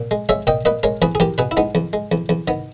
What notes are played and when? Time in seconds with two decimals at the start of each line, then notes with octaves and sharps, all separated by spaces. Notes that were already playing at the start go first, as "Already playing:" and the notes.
Already playing: A#2
0.11 G#3
0.29 G#3 C#5 E5
0.47 A#2 D#5 G5
0.65 A#2 B4 D#5
0.83 G#3 A#4 C#5
1.02 E2 G#4 B4
1.15 G#4
1.20 E2 G4 A#4
1.38 B2 G#4 B4
1.51 E4
1.57 G#3 B3 D#4
1.75 E2
1.93 G#3
2.12 E2
2.29 E2
2.48 D#3 B3